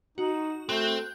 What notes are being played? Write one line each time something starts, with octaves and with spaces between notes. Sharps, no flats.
D#4 F#4
A3 C4 A4 F#6 G6